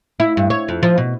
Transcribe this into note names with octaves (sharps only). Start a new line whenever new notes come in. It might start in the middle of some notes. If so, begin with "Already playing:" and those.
E4
G2
C#5
F2
F3
B2